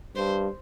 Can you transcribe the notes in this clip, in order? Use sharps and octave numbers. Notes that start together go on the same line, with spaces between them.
G2 C5